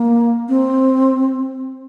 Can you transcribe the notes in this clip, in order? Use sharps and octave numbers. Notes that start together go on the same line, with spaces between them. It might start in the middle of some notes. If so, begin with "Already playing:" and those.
Already playing: A#3
C4